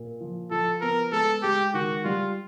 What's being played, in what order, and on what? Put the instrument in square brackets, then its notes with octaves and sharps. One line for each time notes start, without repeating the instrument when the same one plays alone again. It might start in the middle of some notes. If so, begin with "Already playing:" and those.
Already playing: [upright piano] A#2
F3
[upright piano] F3 [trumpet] A4
[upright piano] B3 [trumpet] A#4
[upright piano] G#3 [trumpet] A4
[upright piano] G#3 [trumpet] G4
[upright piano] D#3 [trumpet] F#4
[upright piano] G3 [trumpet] F4